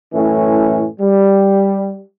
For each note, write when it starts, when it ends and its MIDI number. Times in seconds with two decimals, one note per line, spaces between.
0.13 0.87 42
0.13 0.87 45
0.13 0.87 52
0.13 0.87 57
0.13 0.87 61
1.00 2.02 55